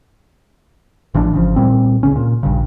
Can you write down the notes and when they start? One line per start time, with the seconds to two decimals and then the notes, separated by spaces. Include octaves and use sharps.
1.14 A1 E3 F3 D4
1.33 G#1 C#3 F3
1.56 C2 A#2 G3 C4
2.03 C#2 C#3 C#4
2.16 A#2
2.43 A#1 G2 C#3